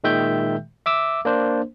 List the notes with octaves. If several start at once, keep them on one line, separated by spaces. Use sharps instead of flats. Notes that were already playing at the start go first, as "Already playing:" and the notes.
A#2 D#3 G#3 E5 G5 G6
E5 D6 E6
A#3 D4 C5